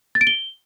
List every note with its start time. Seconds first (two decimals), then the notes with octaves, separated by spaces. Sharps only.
0.15 A6
0.21 D7
0.27 G7